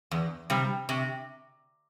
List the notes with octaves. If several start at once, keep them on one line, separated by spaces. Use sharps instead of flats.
E2
C3 G3
C3